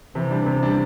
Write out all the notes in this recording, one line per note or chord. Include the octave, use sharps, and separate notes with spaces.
C3 E3
G3 D4
C3
G3 D4